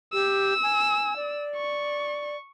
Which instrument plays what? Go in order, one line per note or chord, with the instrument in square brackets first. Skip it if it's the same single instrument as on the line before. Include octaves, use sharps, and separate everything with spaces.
[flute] G4 [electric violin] E6
[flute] G#5
D5
[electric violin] C#6